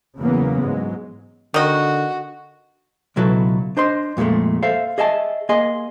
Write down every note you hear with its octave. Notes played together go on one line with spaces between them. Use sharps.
E2 C#3 E3 F#3 A#3 B3
G#2 F#3 G#3
D3 D#3 F#4 D#5
C#2 B2 F#3 E4 A4 B4
D4 C5 D#5 C6
F2 A#2 F3 G#3 A3
A4 C5 E5 F5
G#4 D#5 E5 G#5 A5
A#3 G#4 D#5 G#5 C6